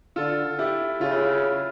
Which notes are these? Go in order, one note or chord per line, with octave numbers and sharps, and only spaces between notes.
D3 F4 A4
E4 G4
C#3 F4
E4
F4